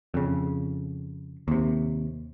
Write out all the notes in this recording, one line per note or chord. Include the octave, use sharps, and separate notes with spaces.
F2 C#3
D#2 C3